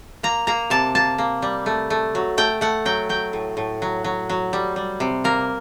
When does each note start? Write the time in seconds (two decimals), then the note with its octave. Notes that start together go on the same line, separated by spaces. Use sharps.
0.23 A#3 A#5
0.47 A#3 A#5
0.70 C3 A5
0.95 A#3 A5
1.18 A#3
1.42 G3
1.66 A3
1.90 A3
2.15 F#3
2.38 A3 G5
2.61 A3 F#5
2.85 F#3 G5
3.09 F#3 G5
3.33 A2
3.57 A2
3.82 F#3
4.04 F#3
4.29 F#3
4.53 G3
4.76 G3
5.00 C3
5.24 A#3 A#4